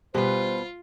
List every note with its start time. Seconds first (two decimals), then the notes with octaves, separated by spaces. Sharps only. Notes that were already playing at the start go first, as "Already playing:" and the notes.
0.14 B2 G3 F4 B4 C5